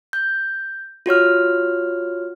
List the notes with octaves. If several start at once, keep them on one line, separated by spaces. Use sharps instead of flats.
G6
F4 F#4 C#5 F6